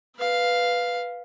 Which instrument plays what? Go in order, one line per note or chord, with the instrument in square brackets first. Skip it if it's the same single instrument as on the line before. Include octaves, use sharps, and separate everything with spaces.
[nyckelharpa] B4 F5